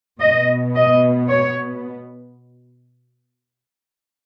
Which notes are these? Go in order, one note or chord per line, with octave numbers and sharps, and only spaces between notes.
B2 B3 D#5
D#5
C#5